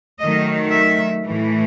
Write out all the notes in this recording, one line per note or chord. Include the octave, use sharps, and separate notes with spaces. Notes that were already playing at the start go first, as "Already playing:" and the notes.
D#3 F#3 A3 D#5
E5
A2 E3 A3